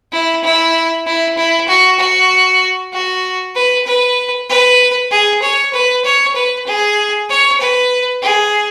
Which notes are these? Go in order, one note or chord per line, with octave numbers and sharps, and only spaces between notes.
E4
E4
E4
E4
F#4
F#4
F#4
B4
B4
B4
G#4
C#5
B4
C#5
B4
G#4
C#5
B4
G#4